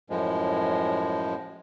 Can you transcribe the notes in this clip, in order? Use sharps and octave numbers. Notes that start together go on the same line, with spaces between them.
F#2 A2 F3 G#3